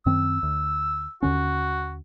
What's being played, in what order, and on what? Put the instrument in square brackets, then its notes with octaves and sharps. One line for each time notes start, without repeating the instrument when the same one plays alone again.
[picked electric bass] F#2 D#3 C4 [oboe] E6
[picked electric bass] D2
[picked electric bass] D#2 D3 C#4 [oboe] F#4